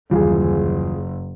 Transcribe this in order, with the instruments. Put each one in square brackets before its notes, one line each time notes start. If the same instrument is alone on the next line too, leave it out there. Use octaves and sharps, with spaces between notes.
[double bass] F#1 [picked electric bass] D#2 E3 G3 [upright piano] F4 G#4